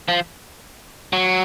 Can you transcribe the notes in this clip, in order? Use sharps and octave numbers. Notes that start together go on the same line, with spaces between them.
F3
F#3